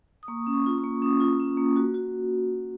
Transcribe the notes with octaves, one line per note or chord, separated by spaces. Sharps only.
D#6
A#3 C#6
C#4
C#6
F4
C#6
A#3
C#4 D#6
F4
C#4
A#3
F#4
F#4